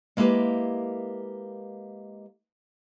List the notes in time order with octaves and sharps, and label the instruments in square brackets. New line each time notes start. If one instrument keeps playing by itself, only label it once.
[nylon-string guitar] G#3 A#3 E4 G4 A#4 B4